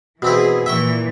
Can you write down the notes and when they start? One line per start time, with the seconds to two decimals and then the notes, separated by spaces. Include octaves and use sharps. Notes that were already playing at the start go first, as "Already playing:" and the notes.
0.22 B2 E3 C4 E4 G#4
0.66 A#2 E3 E5 G5 C#6